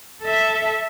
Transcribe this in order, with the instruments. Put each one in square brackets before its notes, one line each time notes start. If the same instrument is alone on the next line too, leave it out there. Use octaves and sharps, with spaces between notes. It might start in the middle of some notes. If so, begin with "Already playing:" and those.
[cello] A4 E5